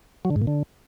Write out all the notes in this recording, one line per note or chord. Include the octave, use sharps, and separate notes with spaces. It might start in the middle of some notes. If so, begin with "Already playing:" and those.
F#3
D3
G#2
A#2
D3